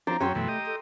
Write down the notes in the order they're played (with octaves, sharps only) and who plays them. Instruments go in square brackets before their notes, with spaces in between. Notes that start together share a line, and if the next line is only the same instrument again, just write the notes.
[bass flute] F3 [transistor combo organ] C4 D4 [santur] A#5
[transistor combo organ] F#2 C#4 [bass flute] F#3 [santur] G5 C6 E6
[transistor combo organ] F#2 B2 E3 [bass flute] A3
[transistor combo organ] G4 D#5
[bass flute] A4